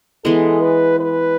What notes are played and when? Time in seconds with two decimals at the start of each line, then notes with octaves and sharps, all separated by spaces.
0.24 E3 G#3 B3 A4
0.62 B4
1.00 B4